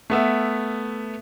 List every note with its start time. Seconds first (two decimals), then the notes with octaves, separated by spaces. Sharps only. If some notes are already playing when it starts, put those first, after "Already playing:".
0.10 A3 B3 E5